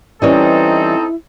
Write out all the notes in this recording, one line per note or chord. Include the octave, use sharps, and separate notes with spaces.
E3 G3 C4 C#4 D#4 E4 A4